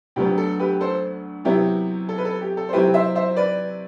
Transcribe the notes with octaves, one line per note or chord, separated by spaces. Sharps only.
D2 D3 F#3 B3 G4
A4
G4 B4
A4 C5
C3 F#3 B3 E4 G4
A4
B4
A4
G4
A4
C5
C3 F#3 C4 E4 G4 B4
C5 E5
C5 E5
B4 D5